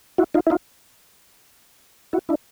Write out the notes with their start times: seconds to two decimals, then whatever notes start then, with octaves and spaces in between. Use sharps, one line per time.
0.18 E4 F#4
0.34 D#4 F4
0.47 E4
0.50 D#4 F4
2.13 E4 F#4
2.29 D4 E4